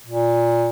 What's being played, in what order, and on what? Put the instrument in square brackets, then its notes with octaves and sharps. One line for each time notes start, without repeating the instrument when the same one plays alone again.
[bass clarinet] A#2